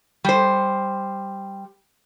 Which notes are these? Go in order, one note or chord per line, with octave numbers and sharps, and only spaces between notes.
G3 C5